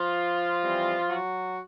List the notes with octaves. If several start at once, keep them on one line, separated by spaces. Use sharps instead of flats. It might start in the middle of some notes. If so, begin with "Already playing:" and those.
Already playing: F3 F4
E3 G3 C4
F#3 F#4